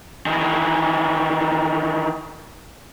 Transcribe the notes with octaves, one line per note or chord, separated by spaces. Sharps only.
D#3 E3